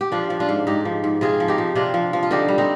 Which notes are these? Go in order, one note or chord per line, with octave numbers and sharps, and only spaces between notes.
G4
F3 D4 F4
F3
D4 F4
G#2
G#2 D#4 G4
F3
G#2
C3 F4 G#4
F3
D#4 G4
F3
C3 D4 F4
F3
F3
F4
D3 D#4 G4
G3
C4 D#4